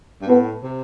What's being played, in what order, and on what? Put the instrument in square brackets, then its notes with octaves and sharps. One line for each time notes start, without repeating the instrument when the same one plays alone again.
[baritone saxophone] G2
[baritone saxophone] A2 [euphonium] B3
[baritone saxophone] C3